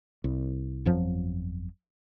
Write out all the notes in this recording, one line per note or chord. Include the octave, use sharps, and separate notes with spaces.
C2
G1 F2 F3 F#3